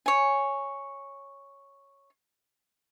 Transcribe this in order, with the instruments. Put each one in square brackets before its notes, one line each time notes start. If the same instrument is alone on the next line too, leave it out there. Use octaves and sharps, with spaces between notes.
[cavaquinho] C#5 G#5